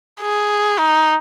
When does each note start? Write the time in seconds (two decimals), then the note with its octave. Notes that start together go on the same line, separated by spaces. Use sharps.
0.21 G#4
0.79 D#4